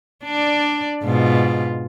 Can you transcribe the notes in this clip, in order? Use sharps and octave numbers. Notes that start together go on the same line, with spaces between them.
D4 D5
G#2 B2 F4